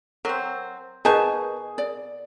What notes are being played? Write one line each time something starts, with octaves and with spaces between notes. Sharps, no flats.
F#3 C4 A#4
B2 D#4 G#4 A#4 B4 G#5 A5
D5